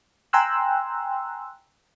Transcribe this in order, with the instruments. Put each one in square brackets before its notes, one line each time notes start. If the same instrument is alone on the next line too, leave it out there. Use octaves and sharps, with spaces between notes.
[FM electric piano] G5 G#5 A#5 C6 E6 F#6